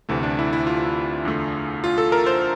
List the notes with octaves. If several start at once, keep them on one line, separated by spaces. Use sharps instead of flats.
D2 C3 E3 A3 E4
D4
E4
E4
F4
E2 D3 A3
F4
A4
A#4
C5